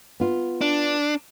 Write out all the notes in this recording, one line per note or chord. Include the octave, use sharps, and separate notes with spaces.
B3 F4
D4